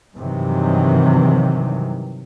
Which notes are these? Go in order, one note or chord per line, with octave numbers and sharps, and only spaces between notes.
G2 C3 D#3 E3 F#3